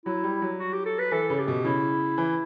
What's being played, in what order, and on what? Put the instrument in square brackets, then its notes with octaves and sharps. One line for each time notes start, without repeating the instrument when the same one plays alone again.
[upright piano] F#3 [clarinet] E4
[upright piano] G3
F#3
[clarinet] F#4
G4
A4
B4
[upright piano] E3 [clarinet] A4
[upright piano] C#3
[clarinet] G4
[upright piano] B2
[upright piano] C#3 [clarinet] E4
[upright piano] E3